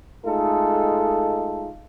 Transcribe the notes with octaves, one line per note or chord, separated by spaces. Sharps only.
G#3 A3 D#4 F4 A4